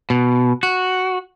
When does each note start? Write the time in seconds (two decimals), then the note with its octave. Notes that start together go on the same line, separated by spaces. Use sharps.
0.10 B2
0.63 F#4